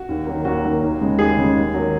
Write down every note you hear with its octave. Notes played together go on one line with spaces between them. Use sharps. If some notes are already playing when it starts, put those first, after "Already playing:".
Already playing: F#4
D#2
D#3 F#3 A#3
D#2 F#4
D#3 F#3 A#3
D#2
C#3 G#3
D#2 G#4
C#3
G#3
D#2
D#3 F#3